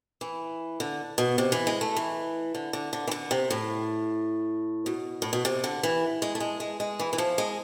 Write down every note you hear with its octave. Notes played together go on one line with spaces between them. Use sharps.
E3
D3
B2
C3
E3
G#3
A3
E3
D3
D3
D3
E3
D3
C3
A2
B2
A2
B2
C3
D3
E3
G#3
A3
G#3
G#3
G#3
E3
E3
F3
G#3